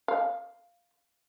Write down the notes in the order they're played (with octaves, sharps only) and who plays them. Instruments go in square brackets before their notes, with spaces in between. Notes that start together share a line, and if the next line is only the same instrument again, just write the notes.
[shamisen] F5